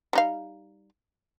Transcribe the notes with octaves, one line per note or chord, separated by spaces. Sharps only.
G3 D#4 F5